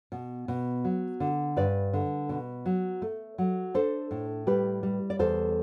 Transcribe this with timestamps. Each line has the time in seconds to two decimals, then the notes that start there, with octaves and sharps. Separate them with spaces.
0.12 B2
0.48 B2
0.84 F#3
1.20 D3
1.56 G2 B4 D5
1.93 D3
2.29 B2
2.66 F#3
3.02 A3
3.38 F#3
3.74 D4 A4 C5
4.11 A2
4.47 G3 G4 B4
4.83 G3
5.10 D5
5.19 E2 A4 C5